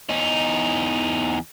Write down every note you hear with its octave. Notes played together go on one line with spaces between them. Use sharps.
E2 D#4